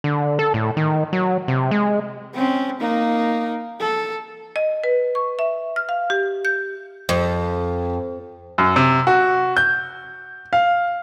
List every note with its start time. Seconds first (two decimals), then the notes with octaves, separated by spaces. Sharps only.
0.04 D3
0.39 A4
0.54 A2
0.77 D#3
1.13 F#3
1.48 C3
1.71 G#3
2.34 C4 C#4
2.80 A#3 D#4
3.80 A4
4.56 D#5
4.84 B4
5.15 C#6
5.39 E5
5.76 F6
5.89 F5
6.10 G4
6.45 G6
7.09 F2
8.58 F#2
8.76 C3
9.07 F#4
9.57 G6
10.53 F5